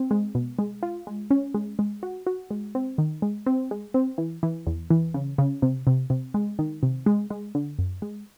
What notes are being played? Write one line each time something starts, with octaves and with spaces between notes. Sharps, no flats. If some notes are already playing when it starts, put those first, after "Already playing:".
Already playing: C4
G#3
B2
G#3
F4
G#3
C#4
G#3
G#3
F#4
F#4
G#3
C4
D#3
G#3
C4
G#3
C4
E3
E3
E2
E3
C#3
C#3
C3
C3
C3
G#3
D#3
C3
G#3
G#3
D3
F#2
G#3